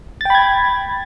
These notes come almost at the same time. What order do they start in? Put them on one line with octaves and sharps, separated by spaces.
A6 G5 B5 G#6